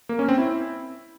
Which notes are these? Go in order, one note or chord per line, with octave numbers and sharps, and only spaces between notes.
A#3
C#4
C4
E4